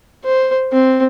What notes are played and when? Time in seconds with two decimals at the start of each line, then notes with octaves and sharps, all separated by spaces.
0.24 C5
0.72 C4